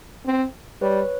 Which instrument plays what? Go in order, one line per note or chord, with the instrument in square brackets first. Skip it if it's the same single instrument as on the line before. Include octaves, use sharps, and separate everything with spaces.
[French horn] C4
[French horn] G3 [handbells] B4 C#5